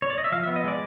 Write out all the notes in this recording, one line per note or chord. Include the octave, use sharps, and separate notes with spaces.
C#5
D5
D#5
E5
F3 F5
E5
B3
D#5
G#3 D5